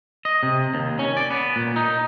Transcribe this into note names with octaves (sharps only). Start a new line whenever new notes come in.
D#5
C3
D#2
C#4
D5
B3
A#2
D#4